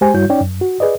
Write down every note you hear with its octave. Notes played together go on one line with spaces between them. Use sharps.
G#3 G4 C5 G#5
G2 G3 E4 F#4 C#5 G6
C#4 D#4 C#5 D5 G5
F#2
F#4
G#4 B4 D5 D#5